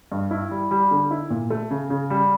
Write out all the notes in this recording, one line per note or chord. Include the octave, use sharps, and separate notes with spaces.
G2
E4
G3
G3
D3
E4
A#2
A3
C#3
C#3
G3